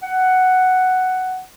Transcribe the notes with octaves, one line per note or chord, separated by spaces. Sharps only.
F#5